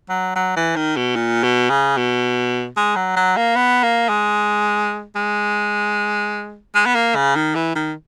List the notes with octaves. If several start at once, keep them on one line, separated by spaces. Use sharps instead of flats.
F#3
F#3
E3
D#3
B2
A#2
B2
C#3
B2
G#3
F#3
F#3
A#3
B3
A#3
G#3
G#3
G#3
B3
A#3
C#3
D#3
E3
D#3